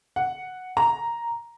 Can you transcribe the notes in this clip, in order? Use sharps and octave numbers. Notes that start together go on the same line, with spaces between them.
F#5
A#5